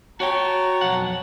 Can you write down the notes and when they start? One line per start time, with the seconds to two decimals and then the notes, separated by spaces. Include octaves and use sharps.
0.20 F#4 C#5 G5 A5 A#5
0.81 B1 F2 F#5